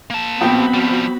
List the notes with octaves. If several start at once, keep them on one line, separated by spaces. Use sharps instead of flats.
A#3 A5
A#1 B3 C4 F#4 G5 B5
F3 G3